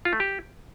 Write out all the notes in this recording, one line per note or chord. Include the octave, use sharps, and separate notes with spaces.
F4
A3
G4